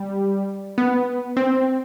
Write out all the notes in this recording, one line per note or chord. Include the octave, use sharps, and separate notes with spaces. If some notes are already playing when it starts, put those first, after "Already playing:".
Already playing: G3
B3
C4